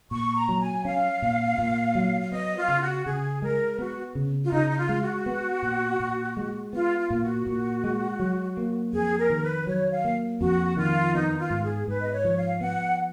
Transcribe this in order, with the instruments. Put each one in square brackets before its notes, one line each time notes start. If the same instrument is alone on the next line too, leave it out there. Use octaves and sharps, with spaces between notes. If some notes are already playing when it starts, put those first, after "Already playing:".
[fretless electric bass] A#2 [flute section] C#6
[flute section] A#5
[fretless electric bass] F#3
[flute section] G#5
[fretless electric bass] C#4 [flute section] F5
[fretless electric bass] A#2
A#2
F#3
[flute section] F5
[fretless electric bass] B3 [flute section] D#5
[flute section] F4
[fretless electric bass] C#3
[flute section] F#4
[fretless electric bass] C#3 [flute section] G#4
[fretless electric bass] G#3 [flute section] A#4
[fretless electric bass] B3 [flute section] F#4
[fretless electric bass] C#3
[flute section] F4
[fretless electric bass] C#3 [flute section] D#4
[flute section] D#4
F4
[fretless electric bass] G#3
[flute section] F#4
[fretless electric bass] B3
A#2
A#2
G#3
[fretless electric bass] B3 [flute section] F4
[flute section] F4
[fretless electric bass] A#2
[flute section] F#4
[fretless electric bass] A#2
G#3
F#3
A#3
[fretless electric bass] F2 [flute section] G#4
[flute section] A#4
[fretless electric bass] D#3
[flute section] B4
[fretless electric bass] F#3 [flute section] C#5
[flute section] F5
[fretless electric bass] A#3
[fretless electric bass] F2 [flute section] F#4
[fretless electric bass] D#3 [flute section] F4
[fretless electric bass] B3 [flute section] D#4
[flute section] F4
[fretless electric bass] G#2
[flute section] G#4
[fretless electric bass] G#2 [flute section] B4
[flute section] D#5
C#5
[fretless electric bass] F3
[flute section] F5
[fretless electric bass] B3 [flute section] F#5